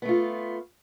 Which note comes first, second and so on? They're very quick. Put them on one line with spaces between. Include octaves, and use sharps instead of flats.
B3 A3 F4